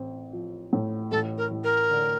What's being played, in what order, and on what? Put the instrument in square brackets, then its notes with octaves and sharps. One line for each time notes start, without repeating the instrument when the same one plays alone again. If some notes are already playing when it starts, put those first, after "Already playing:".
Already playing: [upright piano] A1 C4
F3
A2
[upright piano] A1 [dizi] A4
[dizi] A#4
[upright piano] A1
[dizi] A#4
[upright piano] D3